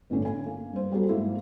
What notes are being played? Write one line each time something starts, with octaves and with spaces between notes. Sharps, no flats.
G1 A2 D3 C#4 D4
G#5
A#3
G2 C5
F#3 G3 B3 G#4 A4
G#2 A#3 E4